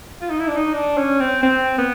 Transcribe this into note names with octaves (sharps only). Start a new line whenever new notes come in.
F4
D#4
E4
D4
D#4
D4
C#4
C4
C4
B3